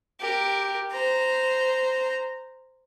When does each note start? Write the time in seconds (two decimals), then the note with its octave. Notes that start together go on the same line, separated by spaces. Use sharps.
0.20 G4 A#4
0.92 C5 A#5